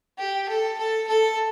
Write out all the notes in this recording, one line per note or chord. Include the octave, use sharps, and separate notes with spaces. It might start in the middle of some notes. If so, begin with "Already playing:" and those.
G4
A4
A4
A4